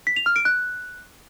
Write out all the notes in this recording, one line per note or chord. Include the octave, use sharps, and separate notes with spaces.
B6
F7
F6
D7
F#6